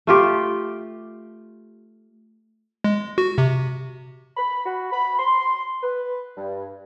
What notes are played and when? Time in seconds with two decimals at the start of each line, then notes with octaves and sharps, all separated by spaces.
0.07 A3 F4 G4
2.84 G#3
3.18 F#4
3.38 C3
4.37 B5
4.66 F#4
4.92 B5
5.19 C6
5.82 B4
6.37 G2